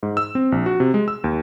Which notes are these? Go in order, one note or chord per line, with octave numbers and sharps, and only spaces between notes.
G#2
E6
C4
A#1
F#4
C3
G#3
E6
D#2